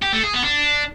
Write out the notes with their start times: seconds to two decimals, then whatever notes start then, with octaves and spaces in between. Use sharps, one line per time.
0.02 G4
0.13 A3
0.23 G#4
0.34 B3
0.44 D4